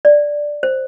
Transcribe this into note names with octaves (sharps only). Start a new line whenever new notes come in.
D5
C5